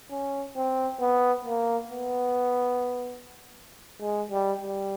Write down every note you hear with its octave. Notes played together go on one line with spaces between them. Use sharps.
C#4
C4
B3
A#3
B3
G#3
G3
G3